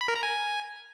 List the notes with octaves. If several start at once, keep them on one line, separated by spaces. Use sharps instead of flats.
B5
A#4
A#5
G#5